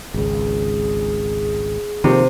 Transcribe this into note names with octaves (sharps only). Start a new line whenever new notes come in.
G#1 C#2 G#4
C3 D#3 F3 A#3